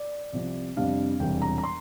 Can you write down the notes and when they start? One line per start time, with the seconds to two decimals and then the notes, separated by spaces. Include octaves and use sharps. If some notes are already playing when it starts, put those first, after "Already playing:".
Already playing: D5
0.33 C2 C3 F3
0.76 F2 C3 G3 D4 F5
1.20 E1 E2 C3 G3 D4 G5
1.42 A#5
1.58 A#5
1.64 C6